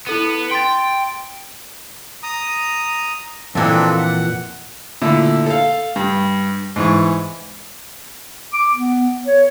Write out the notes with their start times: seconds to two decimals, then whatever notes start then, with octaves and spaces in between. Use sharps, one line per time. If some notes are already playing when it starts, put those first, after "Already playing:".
0.07 B3 E4 A4 D#7
0.51 G5 C6 A6
2.23 A#5 D#6
3.55 F2 A#2 E3 C4 D4 A4
3.98 F#5
5.01 A#2 D3 A3 E4 A4
5.46 A4 F5
5.96 G2
6.76 G#2 E3 C#6
8.53 D6
8.73 B3
9.26 C#5